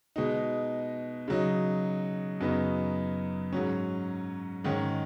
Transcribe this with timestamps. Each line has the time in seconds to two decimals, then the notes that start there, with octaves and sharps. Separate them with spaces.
0.16 B2 G#3 D#4
1.28 C#3 F#3 D#4
2.41 F#2 C#3 B3 D#4
3.53 G#2 F#3 C#4
4.64 G#2 D#3 G#3 C#4